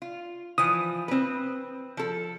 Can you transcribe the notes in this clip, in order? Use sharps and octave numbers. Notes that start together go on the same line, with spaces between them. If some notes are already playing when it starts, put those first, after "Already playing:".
F4
E3 F3 D#6
C4 B4
F3 A4